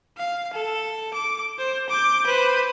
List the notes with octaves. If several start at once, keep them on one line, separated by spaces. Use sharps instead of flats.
F5
A4
D6
C5
D6 G6
B4 C5